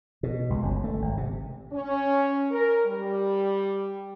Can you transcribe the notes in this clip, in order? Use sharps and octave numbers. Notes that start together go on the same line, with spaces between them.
B2
C#2
G1
A3
G#1
C3
C#4
A#4
G3